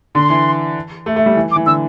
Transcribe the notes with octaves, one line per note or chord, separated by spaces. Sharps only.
D3 C6
E3
A3
A3
G3
E3
D6
E3
D3 E6